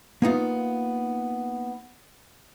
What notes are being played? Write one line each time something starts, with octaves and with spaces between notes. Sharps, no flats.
A#3 B3 D#4 F4